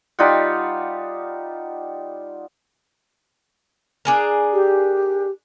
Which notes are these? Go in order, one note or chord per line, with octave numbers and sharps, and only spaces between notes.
G3 D#4 F4 F#5
D4 G#4 A#4
G4